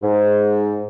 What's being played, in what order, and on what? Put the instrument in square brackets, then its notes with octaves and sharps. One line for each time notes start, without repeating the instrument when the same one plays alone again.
[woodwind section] G#2